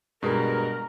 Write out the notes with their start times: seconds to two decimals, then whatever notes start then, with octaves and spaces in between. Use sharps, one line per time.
0.22 G2 B2 G#3 A#4